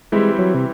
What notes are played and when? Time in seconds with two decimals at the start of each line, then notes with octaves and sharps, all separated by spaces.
0.12 E3 G3 G#3 C4 E4 G4
0.38 F#3
0.54 C3